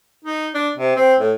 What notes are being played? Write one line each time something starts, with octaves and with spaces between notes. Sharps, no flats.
D#4
D4
C3
C4
A2